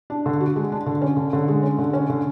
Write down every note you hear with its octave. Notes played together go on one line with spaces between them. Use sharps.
D4
D3
F#4
G#3
D4
D3
C#4
D3
D3
G#3
C#4
D3
C#4
D3